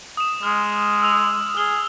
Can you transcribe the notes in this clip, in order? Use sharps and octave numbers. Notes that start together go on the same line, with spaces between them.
D#6 E7
G#3 F6
E6 F7
G#4 F6 G7